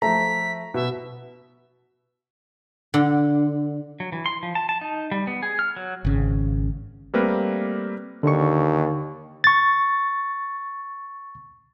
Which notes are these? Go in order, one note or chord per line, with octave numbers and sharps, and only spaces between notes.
F3 A3 A#5 B6
B2 E5
D3
F#3
E3
C6
F3
A5
A5
D#4
G3
B3
G#4
F6
F#3
G#1 C#3
G3 A3 A#3 C4 A#4 B4
D#2 D3 C#6
C#6 A6